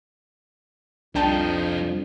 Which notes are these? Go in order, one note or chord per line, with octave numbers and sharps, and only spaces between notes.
C2 F2 F3 D4 D#4 G5 A5